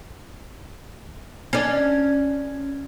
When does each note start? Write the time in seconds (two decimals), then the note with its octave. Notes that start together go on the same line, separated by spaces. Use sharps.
1.53 C#4 D4